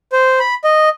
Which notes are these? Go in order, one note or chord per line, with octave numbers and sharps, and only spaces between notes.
C5
B5
D#5